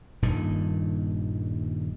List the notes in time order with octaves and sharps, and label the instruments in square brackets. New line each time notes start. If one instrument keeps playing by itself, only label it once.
[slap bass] D#1 G2 A#2 D#3